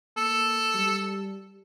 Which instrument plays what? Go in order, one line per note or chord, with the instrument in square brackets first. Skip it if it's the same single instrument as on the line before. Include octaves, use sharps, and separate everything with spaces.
[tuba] A#3 [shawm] A4
[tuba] G3